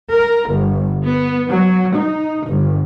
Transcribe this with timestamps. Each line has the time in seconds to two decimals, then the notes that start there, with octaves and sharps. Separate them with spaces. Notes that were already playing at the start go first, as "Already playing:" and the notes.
0.11 A#4
0.47 G1
1.05 B3
1.48 F#3
1.95 D#4
2.47 G1